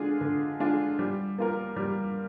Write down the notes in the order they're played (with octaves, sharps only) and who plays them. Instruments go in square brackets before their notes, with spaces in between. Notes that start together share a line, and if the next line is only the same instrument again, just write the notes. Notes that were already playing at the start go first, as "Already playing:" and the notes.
Already playing: [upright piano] D3 G#3 D4 F4 G#4
D3
G#3 D4 F4 G#4
G3
A#3 F4 A#4
G3